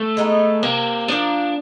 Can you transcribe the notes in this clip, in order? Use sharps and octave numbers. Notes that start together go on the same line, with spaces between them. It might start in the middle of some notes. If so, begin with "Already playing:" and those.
Already playing: A3
G#3 B3 D#4
C3 A#3
F3 A#3 D4